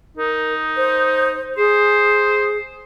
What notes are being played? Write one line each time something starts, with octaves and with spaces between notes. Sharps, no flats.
D#4 A#4
C5
G#4 C5